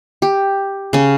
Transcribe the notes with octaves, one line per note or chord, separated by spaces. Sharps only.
G4
C#3 C#4